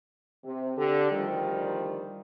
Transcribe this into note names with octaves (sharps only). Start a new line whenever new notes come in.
C3
D3 G4 A4
D2 D#3 F3 G3